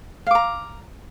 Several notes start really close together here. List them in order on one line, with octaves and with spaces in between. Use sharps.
F5 D6 A#5